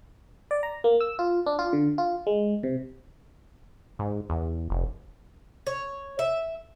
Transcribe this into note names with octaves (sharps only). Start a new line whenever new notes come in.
D5
A#5
A#3
E6
F4
D4
F4
D3
F4
G#3
C3
G#2
E2
F1
C#5
E5